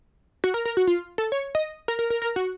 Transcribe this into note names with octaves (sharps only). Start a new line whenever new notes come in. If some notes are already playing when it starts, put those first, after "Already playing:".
F#4
A#4
A#4
F#4
F4
A4
C#5
D#5
A#4
A#4
A#4
A#4
F#4